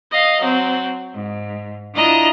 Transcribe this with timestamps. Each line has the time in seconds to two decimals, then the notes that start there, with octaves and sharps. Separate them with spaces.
0.10 D#5 F5
0.42 F#3 C4
1.15 G#2
1.95 D4 E4 F4 D#5 A#5